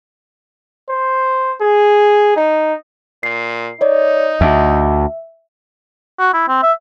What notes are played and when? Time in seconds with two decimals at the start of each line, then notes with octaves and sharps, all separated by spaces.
0.89 C5
1.61 G#4
2.36 D#4
3.23 A#2 C7
3.81 D#4 C#5 D5
4.41 D2 E5
6.19 F#4
6.34 E4
6.48 C4
6.63 E5